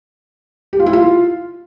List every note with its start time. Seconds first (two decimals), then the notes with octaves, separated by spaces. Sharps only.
0.73 G4
0.80 F4
0.86 E4
0.93 F4